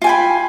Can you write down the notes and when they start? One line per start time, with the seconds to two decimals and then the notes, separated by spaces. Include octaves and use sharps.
0.02 F4
0.04 G#5
0.07 G5
0.09 B5